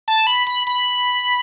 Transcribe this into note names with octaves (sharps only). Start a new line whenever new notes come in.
A5
B5
B5
B5